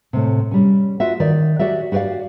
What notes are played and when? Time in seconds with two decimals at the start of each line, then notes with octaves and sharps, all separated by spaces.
0.13 A2 C3
0.51 G3 C#4
1.00 F4 F#4 E5
1.20 D#3 D5
1.59 F#4 G4 D5 E5
1.92 F#4 G4 B4 D5 F5